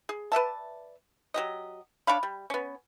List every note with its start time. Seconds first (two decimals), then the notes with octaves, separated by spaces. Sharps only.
0.09 G#4
0.32 B4 D5 E5 A5
1.34 F#3 G4 D#5
2.07 D4 C#5 F5 B5
2.23 G3
2.50 B3 C#4